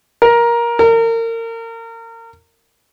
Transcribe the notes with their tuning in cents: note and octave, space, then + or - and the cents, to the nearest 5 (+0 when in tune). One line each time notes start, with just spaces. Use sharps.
A#4 +15
A#4 -30